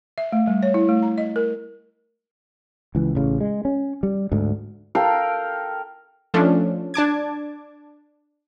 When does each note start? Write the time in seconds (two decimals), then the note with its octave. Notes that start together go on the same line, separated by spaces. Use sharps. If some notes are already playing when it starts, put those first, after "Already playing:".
0.18 E5
0.32 A3
0.47 G3
0.63 C#5
0.74 E4
0.89 A3
1.02 A#5
1.18 D#5
1.36 A#4
2.95 C#2 E3
3.15 A1 C#3
3.41 G#3
3.65 C#4
4.03 G3
4.32 D2 G#2
4.95 A4 A#4 F5 G5
6.34 F3 A3 C#4 D4
6.94 D4 A5 D6 G#6